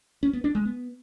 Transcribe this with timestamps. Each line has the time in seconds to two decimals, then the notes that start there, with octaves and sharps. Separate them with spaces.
0.23 C#4
0.33 B3
0.44 D4
0.55 G#3
0.65 B3